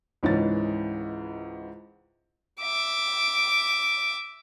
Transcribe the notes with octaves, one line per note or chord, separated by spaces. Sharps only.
C#2 G#2 E3 C#4 A6
E5 D6